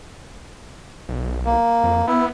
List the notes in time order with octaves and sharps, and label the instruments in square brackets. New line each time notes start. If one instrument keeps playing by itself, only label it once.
[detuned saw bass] B1
[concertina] A#3
[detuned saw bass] F2
[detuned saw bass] B3 [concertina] E4